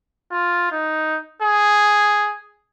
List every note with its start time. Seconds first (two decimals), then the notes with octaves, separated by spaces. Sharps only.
0.32 F4
0.72 D#4
1.42 G#4